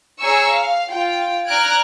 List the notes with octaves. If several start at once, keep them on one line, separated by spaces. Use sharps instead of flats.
G#4 C#5 G#5 A#5 C#6 E6
F5
F4 G5
D5 A#5 F6 F#6 G#6 D7